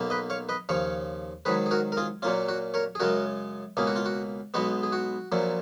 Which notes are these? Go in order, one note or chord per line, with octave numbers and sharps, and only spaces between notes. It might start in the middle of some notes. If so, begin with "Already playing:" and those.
Already playing: B1 B2 A#3
B4 D#5
C#5 F5
B4 D#5
D#2 C#3 F3 C#5 F5
G#2 D#3 F#3 G#4 B4
G#4
F#4 A#4
A#4
F4 G#4
A#2 F#3 A#3 C#4 F4
F#4
A#4 C#5
G#4
F#2 C#3 G#3 F#4 A#4
C#2 B2 A#3 C#4 G#4
F#4
F4
F#4
B1 B2 G#3 B3 F#4
G#4
F#4
A#1 A#2 F#3 C#4